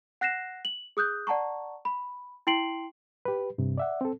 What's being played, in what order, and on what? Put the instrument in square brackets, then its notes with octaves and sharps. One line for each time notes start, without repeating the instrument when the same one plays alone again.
[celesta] F#5 F#6 A#6 C7 E7
F#7
G#4 D#6 F#6 G6
D5 F#5 A5 A#5 C#6
B5
E4 G5 C6 C7 D7 F#7
[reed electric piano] G4 B4
G2 C3
D5 E5 F#5
C4 A4